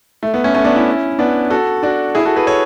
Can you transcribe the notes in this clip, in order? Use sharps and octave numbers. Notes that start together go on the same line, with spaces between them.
A3
B3
A3 C#4
A3 C#4
B3 D4
C#4 E4
B3 D4
F#4 A4
D4 F#4
E4 G#4
F#4 A4
G#4 B4
A4 C#5